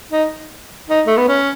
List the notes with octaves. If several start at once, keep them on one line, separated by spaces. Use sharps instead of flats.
D#4
D#4
A3
B3
C#4